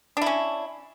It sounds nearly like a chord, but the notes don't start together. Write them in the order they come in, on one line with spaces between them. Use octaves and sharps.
D4 E4 C#4